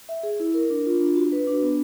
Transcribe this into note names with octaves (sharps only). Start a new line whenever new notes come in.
E5
G#4
E4
A#4
D4
F4
D4
F#4
B4
D4
B3